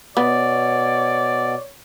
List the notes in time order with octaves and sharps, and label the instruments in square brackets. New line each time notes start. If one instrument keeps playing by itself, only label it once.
[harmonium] B2 [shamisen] B3 [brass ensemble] C#5 [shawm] D5